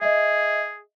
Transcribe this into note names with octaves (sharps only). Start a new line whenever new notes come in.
G#4 D#5 E5